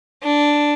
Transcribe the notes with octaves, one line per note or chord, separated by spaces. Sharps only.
D4